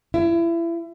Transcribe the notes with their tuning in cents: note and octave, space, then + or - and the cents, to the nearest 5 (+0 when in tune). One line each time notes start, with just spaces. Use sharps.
E4 +30